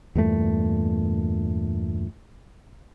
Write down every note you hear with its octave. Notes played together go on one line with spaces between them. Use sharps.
E2 G2 A#2 A3